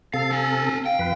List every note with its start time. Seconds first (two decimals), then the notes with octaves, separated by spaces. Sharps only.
0.14 C3 A4 F5
0.31 C4 G#5
0.86 F5 G5
0.99 F2 B4